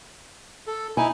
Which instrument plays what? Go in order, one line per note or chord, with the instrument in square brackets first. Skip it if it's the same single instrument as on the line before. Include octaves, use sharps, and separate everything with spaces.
[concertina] A4
[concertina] D#4 E4 [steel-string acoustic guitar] G#5